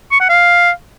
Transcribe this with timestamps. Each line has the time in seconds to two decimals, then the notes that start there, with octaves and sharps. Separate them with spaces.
0.12 C#6
0.20 F#5
0.29 F5